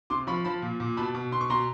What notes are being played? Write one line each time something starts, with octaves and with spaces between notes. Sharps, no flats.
C3 C6 D6
F3 B5 C#6
F3 A5 B5
A#2
A#2
B2 A5 B5
B2
B2 C6
C#6
B2 A#5 C6